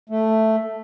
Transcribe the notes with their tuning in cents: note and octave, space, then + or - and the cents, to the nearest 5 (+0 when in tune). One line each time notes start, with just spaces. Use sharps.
A3 +5